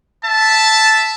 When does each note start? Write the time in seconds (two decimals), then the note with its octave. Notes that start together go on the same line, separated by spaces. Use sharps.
0.23 E5 A5